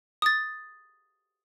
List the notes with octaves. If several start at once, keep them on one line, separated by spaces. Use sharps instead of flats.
D#6 A6